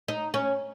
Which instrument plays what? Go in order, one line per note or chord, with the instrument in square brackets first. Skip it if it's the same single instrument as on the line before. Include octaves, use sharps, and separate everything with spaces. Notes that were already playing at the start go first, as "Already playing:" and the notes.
[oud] D#4
C#4